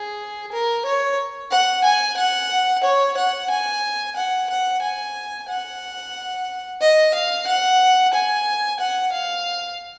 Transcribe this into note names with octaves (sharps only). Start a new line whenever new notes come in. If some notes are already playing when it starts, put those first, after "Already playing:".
Already playing: G#4
A#4
C#5
F#5
G#5
F#5
C#5
F#5
G#5
F#5
F#5
G#5
F#5
D#5
F5
F#5
G#5
F#5
F5